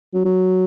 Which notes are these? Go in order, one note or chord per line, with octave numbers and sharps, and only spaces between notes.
F#3
F#3